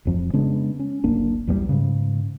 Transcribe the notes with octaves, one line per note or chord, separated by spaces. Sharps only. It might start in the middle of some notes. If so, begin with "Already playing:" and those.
E1 F2 F3
C#3 G#3 B3 D4
C#4
F#1 C2 A#3 D4
B1 E2 F3 G3
G#2 C#3